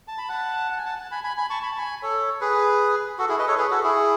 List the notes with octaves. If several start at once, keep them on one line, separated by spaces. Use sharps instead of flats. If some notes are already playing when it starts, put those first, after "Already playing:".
A5
B5
F#5 A5
F#5
G#5
F#5 A5
F#5 A5
G#5 B5
G#5 B5
G#5 B5
A5 C#6
B5
A5
G#5 B5
A4 C#5
G#4 B4
F#4 A4
E4 G#4
B4 D#5
A4 C#5
G#4 B4
F#4 A4
E4 G#4